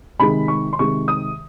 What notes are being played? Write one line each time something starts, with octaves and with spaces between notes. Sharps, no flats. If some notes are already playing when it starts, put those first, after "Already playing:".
C3 D#3 G#3 B5
C#6
C6
C3 D#3 G#3 C#6
D#6